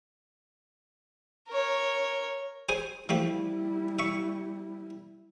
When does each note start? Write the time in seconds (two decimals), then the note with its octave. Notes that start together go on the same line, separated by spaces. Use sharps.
1.49 A#4 C#5
2.69 G#4 C5 G#5
3.09 F3 G3 A3 E4 G4
3.99 E5 C#6